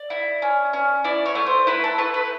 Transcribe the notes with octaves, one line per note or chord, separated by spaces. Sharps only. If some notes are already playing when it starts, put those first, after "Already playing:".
Already playing: D5
E4
C#4
C#4
E4 D5
C#5
A3
C5
E4 B4
A4
A3 B4
B4